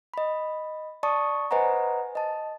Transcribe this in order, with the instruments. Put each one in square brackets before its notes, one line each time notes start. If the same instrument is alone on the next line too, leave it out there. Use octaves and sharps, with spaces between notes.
[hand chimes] D#5 B5
D5 A5 C#6 D#6
B4 C5 D#5 F#5 G#5 A#5
D#5 A5